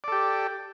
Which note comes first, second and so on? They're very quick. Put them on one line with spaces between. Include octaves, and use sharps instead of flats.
D5 A4 G4